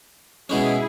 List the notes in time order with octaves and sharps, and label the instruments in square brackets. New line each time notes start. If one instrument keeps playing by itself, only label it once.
[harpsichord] B2 G#3 C#4 [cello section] E4 G#4